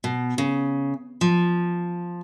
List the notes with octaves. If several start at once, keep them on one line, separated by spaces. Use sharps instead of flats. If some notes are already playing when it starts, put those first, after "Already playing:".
B2
C#3
F3